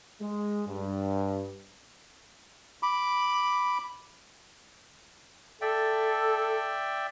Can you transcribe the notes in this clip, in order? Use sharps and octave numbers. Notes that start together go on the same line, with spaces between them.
G#3
G2
B5 D6
A4 D5 E5 G5